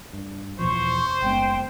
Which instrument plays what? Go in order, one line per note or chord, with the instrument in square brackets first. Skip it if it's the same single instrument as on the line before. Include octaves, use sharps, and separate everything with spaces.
[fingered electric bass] G2
[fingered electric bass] E2 B2 F3 [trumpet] C5 [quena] C#6
[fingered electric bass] F#1 G#3 B3 [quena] G5